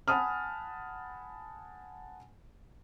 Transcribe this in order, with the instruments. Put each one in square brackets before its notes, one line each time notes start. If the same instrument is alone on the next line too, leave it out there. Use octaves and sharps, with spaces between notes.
[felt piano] F#5 G#5 A5 B5 D#6 F6